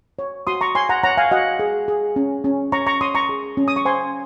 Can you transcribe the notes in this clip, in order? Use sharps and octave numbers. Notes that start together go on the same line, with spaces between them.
C#5
F#4 C6 D#6
A#5 C#6
C#5 G#5 C6
F#5 A#5
C#5 F#5 A#5
F5 G#5
F#4 D#5 F#5
G#4
G#4
C#4
C#4
C#5 A#5 C#6
A#5 C#6
C#5 C6 D#6
A#5 C#6
G#4
C#4
D#6
C#6
C5 G#5 C6